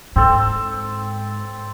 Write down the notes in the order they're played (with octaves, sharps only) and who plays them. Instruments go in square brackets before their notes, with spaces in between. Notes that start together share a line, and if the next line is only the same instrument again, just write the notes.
[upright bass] G#2 [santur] C4 A4